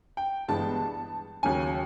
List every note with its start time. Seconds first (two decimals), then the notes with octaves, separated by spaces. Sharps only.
0.17 G5
0.48 G1 G2 E3 G#3 B3 A5
1.43 D#2 C#3 F#3 G#5